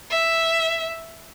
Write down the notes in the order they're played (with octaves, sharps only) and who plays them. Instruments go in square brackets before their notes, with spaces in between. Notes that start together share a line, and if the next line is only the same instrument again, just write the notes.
[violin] E5